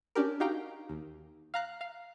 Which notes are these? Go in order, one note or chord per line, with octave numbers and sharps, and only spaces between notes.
C#4 D4 G4 A#4
D#4 F#4 G4 F5 G5 A#5
D#2
F5 A#5 F#6
F5